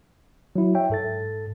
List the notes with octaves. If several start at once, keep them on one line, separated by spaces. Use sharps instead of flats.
F#3 E4
C#5 E5 G5
G#2 A4 A6